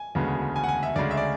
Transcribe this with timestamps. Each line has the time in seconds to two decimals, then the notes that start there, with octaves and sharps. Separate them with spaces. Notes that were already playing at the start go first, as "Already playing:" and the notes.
Already playing: G#5
0.15 E1 D2 C#3 G#3 B3
0.56 G#5
0.64 F#5
0.68 G#5
0.83 E5
0.96 D2 C#3 G#3 D5
1.11 E5
1.17 D5